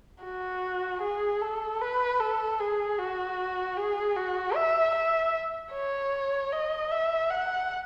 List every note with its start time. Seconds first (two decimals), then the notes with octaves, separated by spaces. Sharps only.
0.24 F#4
1.02 G#4
1.42 A4
1.81 B4
2.20 A4
2.60 G#4
2.99 F#4
3.77 G#4
4.16 F#4
4.55 E5
4.95 E5
5.73 C#5
6.52 D#5
6.91 E5
7.30 F#5